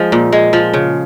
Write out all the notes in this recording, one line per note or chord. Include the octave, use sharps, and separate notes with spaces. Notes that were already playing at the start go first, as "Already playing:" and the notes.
Already playing: F3 G#3
A#2
G#3
F3
C#3